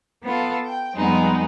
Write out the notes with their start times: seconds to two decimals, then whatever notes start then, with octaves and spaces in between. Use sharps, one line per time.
0.24 B3 F4 A4
0.66 G5
0.96 F2 G3 G#3 B3 D#4